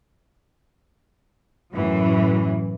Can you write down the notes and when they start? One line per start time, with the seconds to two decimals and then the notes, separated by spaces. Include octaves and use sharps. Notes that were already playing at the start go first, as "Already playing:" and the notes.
1.74 F#2 A2 E3 F#3